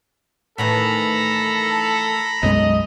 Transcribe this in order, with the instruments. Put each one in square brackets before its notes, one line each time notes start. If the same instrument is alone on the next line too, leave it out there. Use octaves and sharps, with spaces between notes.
[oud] A2 D#3 E3 [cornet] A4 [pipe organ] A#5 B5
[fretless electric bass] B1 F#2 G#3 [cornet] D#5